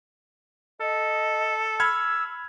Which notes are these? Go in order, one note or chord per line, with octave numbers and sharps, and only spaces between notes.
A4 D#5
B5 E6 F6 G#6